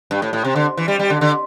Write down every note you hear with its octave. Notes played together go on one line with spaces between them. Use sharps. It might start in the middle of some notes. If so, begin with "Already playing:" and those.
G2
A2
A2
C3
D3
E3
G3
G3
D3
D3